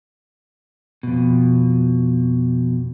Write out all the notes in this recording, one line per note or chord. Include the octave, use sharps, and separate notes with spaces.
F2 B2